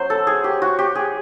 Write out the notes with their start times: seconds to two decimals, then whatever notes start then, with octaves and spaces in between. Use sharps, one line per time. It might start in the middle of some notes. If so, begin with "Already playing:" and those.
Already playing: F#3 C#4 C5
0.10 A4
0.27 G#4
0.44 G4
0.62 F#4
0.79 G4
0.95 G#4